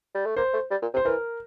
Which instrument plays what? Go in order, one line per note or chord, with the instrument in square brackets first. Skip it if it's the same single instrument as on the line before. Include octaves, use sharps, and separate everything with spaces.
[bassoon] G3
A3
[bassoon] A#3 [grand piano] C5
[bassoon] A3
G3
A#2
C3
[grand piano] C5
[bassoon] E3 [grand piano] A#4